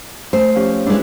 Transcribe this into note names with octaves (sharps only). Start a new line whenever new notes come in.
A3 C5
F3 C#4 G4
G#3 D4 E4 B4